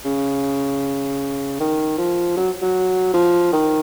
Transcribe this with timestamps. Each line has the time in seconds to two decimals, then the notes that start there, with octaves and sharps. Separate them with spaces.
0.05 C#3
1.60 D#3
1.98 F3
2.37 F#3
2.62 F#3
3.14 F3
3.53 D#3